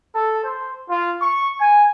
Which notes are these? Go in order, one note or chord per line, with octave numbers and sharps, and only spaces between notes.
A4
C5
F4
C#6
G#5